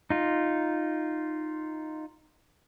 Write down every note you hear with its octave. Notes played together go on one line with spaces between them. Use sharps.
D#4 F4